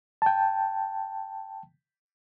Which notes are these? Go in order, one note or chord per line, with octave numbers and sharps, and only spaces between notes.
G5 A5